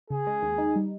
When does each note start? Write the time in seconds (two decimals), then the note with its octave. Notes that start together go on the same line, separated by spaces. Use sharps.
0.10 C#3 G#4
0.27 G#3
0.42 D#2
0.58 D#4
0.76 G3